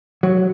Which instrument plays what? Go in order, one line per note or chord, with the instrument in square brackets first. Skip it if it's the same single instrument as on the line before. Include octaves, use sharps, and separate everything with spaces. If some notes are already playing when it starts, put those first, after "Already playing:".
[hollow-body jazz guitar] F#3